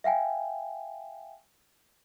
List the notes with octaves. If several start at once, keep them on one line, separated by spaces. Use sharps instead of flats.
E5 F5 G5 G#5